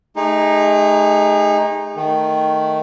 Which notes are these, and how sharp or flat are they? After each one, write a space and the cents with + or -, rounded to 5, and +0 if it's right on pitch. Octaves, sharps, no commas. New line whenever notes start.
A3 -25 D#4 +0 G#4 -40
D#3 +0 A3 +5